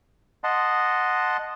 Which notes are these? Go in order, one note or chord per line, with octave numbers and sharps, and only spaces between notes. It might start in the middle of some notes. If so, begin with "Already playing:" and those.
D#5 F#5 A5 C6